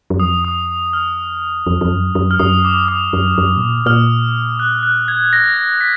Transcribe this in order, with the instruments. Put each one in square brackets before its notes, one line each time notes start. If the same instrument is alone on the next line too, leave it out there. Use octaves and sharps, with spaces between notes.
[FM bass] F#2
[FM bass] F2 [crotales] D#6
[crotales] D#6
F6
[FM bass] F2
F2
F#2
F#2
[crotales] F6
[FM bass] F#2 [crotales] D#6
[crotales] D6
D#6
[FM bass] F#2
F#2
B2
A#2
[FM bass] A#2 [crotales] F6
[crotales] F#6
F#6
G#6
A#6
A#6
B6